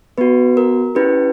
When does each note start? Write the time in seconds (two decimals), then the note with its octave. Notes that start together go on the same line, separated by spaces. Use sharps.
0.18 B3 F#4 B4
0.57 A#4
0.95 C#4 E4 G4 B4